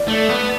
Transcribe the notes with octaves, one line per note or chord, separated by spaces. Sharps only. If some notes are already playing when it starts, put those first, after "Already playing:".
Already playing: D5
A3
B3